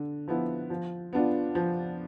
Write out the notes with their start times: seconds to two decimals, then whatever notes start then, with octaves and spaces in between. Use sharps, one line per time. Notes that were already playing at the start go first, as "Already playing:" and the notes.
Already playing: D3
0.28 F3 B3 E4
0.70 F3
1.13 B3 D4 F4
1.55 F3